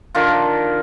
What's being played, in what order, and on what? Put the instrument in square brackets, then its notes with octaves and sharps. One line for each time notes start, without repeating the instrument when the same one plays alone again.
[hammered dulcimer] D3 D#3 F4